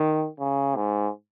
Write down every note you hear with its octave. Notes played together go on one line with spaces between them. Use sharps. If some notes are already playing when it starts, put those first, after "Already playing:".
Already playing: D#3
C#3
G#2